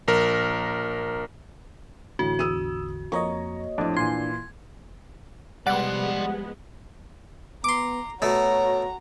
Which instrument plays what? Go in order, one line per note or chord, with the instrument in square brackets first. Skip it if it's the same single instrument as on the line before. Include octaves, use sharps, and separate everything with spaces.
[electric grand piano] A#1 A#4
[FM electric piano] A1 D3 [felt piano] A2 [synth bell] F#4
[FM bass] E2 [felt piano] D#6 E6 D#7
[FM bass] F2 [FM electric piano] A#3 C#5 D#5 [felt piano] A#5 C#6
[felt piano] F2 A2 D5 [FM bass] D4
[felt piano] A#2 E3 [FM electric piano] G#5 C6 [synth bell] G#6
[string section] F3 G#3 B3 [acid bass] G3 [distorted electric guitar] D5 C6 [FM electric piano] F#5
[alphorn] B3 [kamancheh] A#5 [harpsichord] C6 D6
[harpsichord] B2 A3 [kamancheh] F#4 A#5 [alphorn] C#5